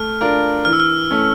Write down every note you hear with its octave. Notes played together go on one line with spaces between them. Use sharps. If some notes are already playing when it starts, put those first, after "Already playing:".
Already playing: A3 F6
D4 F4 A#4
E3 F6
E6
F6
A3 C#4